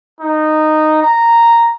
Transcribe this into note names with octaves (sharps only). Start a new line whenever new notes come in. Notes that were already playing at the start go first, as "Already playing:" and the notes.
D#4
A#5